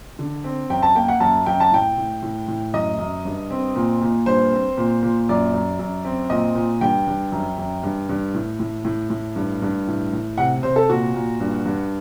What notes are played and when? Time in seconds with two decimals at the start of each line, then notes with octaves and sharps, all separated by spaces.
0.19 D3
0.44 C4
0.70 F#2 G5
0.83 A5
0.95 A#3 G5
1.08 F#5
1.20 F#2 A5
1.46 F#2 G5
1.60 A5
1.72 A2 G5
1.98 A2
2.23 A2
2.48 A2
2.73 F#2 D#5
2.99 F#2
3.25 G2
3.51 C4
3.76 A#2
4.02 A#2
4.26 G2 C5
4.52 C4
4.78 A#2
5.03 A#2
5.29 F#2 D5
5.54 F#2
5.79 F#2
6.05 C4
6.30 A#2 D#5
6.55 A#2
6.81 G2 G5
7.07 G2
7.32 F#2
7.58 F#2
7.83 G2
8.09 G2
8.34 A2
8.60 A2
8.85 A2
9.10 A2
9.36 G2
9.62 G2
9.88 A2
10.13 A2
10.38 C3 F#5
10.63 C3 C5
10.76 A4
10.90 A#2 F#4
11.14 A#2
11.40 G2
11.65 G2